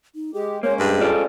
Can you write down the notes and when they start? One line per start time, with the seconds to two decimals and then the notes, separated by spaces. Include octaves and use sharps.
0.15 D#4
0.34 G#3 G4 G#4
0.63 G#3 A#3 C#4 C5 C#5
0.80 G2 G#4
1.01 F4 A4 D5